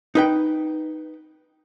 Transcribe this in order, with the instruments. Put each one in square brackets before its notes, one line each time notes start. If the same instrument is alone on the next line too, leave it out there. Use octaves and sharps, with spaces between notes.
[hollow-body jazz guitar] D#4 B4 G5